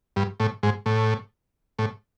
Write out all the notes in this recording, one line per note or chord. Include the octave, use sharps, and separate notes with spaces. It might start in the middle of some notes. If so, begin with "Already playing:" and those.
G2
A2
G#2
A2
A2